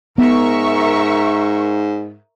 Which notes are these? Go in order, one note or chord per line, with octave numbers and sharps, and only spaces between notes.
G#2 B3 A#4 E5 C#6